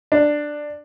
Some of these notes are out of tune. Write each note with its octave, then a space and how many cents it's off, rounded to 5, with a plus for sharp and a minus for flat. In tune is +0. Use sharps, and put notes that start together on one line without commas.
D4 +10